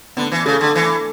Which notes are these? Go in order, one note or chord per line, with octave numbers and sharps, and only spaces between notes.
D3 B3
E3
C#3 A3
D3
E3